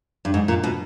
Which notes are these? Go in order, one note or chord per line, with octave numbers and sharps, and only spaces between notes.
G2
G#2
A#2
B2